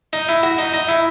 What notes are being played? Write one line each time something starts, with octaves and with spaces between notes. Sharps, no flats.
D#4
E4
F#4
D#4
D#4
E4